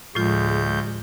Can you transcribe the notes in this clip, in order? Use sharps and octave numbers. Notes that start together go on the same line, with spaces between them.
D2 A2 F3 G#3 F4 G6